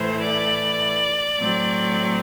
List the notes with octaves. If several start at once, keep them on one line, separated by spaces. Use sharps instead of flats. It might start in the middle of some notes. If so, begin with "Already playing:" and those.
Already playing: A2 E3 A3 C5
D5
A2 F#3 A3 C4